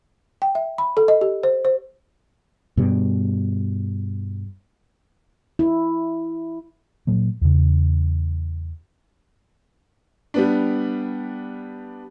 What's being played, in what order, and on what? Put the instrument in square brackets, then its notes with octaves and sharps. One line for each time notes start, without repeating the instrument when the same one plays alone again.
[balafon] G5
E5
B5
A4
D#5
G4
C5
C5
[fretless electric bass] G2 B2 G3
[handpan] E4
[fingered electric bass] A#2 F#3 A#3
E2 C#3
[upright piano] G3 B3 D4